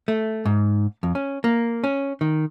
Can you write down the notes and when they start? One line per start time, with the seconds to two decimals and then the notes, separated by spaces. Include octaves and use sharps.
0.08 A3
0.45 G#2
1.03 F2
1.15 C#4
1.44 A#3
1.84 C#4
2.21 D#3